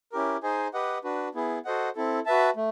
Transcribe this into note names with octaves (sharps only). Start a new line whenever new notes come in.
C#4 E4 G4 A#4
D#4 G#4 C5 D#5 G#5
G4 B4 D#5 F#5
D4 F#4 B4
B3 E4 G#4
F#4 A4 C5 D#5 F#5
C4 E4 A4
F#4 B4 E5 A5
A3